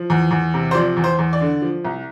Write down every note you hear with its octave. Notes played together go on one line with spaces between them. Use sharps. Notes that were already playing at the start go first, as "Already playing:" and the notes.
Already playing: F3
E2
E2
C3
C5
F3 D5
E2
C5
E2
D5
D3
F3
C2